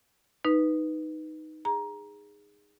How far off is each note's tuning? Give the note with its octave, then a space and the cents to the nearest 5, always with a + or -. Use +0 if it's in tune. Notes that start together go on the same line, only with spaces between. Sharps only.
D#4 +0 B4 +0
G#4 -15 A#5 +15